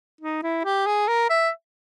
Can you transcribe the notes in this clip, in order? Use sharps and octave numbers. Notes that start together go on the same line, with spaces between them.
D#4
E4
G4
G#4
A#4
E5